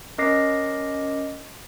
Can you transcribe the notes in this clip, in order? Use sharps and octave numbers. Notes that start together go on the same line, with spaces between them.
C#4 A#4 D#5 D6 A#6 C7